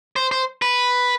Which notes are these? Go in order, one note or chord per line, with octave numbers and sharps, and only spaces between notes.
C5
C5
B4